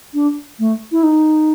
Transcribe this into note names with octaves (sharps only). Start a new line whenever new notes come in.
D4
A3
E4
D#4